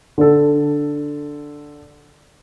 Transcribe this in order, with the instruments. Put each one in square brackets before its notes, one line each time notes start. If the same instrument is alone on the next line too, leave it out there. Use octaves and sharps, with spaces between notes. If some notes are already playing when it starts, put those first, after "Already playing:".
[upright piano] D3 A4